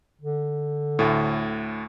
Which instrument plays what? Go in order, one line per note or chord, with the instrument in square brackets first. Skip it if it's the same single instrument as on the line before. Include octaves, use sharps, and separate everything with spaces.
[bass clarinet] D3
[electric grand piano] D2 A2